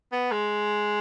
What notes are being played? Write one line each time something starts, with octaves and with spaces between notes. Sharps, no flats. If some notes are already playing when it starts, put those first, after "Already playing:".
B3
G#3